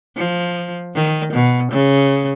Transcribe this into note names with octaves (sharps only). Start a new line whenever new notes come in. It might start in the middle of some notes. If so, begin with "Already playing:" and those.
F3
D#3
B2
C#3